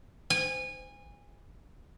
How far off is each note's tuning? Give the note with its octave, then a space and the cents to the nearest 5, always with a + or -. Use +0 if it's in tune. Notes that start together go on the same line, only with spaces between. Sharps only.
G#5 -25